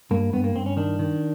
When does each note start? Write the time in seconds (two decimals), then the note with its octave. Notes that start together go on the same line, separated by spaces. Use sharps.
0.11 G2 A#3
0.33 G2 B3
0.44 A#3
0.55 G2 C4
0.66 C#4
0.77 D#3 D4
0.99 D#3